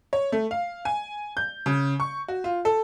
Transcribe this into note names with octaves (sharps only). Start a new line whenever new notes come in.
C#5
A3
F5
G#5
G6
C#3
C#6
F#4
F4
A4